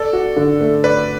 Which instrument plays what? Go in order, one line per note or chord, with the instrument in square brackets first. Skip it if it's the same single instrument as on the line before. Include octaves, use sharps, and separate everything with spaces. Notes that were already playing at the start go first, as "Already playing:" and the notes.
Already playing: [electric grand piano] A4 [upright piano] D5
[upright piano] F#4
D3
A3
[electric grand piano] B4 [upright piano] D5